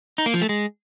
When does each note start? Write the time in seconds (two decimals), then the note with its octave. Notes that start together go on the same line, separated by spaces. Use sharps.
0.18 D#4
0.26 A#3
0.34 F3
0.42 A3
0.49 G#3